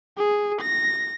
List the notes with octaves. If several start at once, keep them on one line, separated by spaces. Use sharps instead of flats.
G#4
A#6